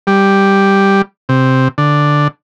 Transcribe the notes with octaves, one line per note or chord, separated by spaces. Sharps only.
G3
C3
D3